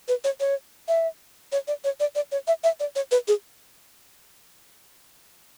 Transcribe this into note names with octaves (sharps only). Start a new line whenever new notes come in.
B4
C#5
C#5
E5
C#5
D5
C#5
D5
D5
C#5
E5
E5
D5
C#5
B4
G#4